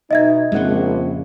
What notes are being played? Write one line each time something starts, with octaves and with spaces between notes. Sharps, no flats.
B2 D#4 D#5 E5 G#6
A#1 F2 A#2 C#3 G#3 C4 F#5